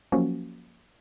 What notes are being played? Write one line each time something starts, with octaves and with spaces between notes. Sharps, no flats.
F3 F#3 A#3 C#4 F#4